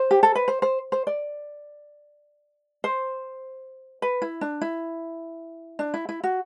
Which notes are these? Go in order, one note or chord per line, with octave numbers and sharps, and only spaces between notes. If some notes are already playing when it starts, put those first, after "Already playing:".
Already playing: C5
G4
A4
B4
C5
C5
C5
D5
C5
B4
E4
D4
E4
D4
E4
E4
F#4